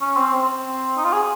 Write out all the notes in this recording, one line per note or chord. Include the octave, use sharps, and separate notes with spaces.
C#4
C4
C4
D#4
F4
G#4